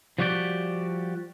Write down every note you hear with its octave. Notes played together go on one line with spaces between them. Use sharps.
F3 G3 F#4 G4 D5